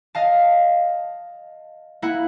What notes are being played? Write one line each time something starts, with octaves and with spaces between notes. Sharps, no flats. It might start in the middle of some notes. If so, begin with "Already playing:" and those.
D#5 F5 A5
A#3 E4 F#5